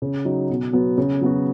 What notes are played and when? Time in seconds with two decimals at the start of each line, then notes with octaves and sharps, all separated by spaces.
0.02 C#3
0.25 F#3 D#4
0.50 B2
0.73 F#3 B3
0.98 C#3
1.21 F#3 B3 F#4